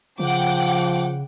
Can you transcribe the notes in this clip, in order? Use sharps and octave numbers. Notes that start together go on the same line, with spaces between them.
C#3 F3 F#5 G5 D6